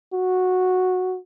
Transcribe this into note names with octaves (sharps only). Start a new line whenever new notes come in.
F#4